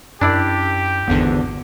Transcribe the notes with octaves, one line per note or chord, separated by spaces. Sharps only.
F#2 D4 E4 G4 D5
G#1 E2 D3 B3